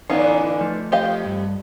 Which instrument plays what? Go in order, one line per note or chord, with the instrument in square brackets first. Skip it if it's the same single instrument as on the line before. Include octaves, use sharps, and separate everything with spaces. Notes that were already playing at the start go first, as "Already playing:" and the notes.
[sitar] A2 D3 E3 [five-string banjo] B3 C#4 D#4 [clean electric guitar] F5
[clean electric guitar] F3 A3 F4
[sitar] F2 [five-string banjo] G4 D#5 F5
[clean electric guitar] G2